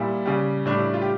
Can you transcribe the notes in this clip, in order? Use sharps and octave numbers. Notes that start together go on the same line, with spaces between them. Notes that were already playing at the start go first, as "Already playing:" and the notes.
Already playing: A#2 G3 E4
C#3 G3
A2 D4
G3
E4
F4
G4